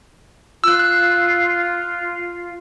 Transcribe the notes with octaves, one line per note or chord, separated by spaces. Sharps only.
F4 E6 F#6
F#6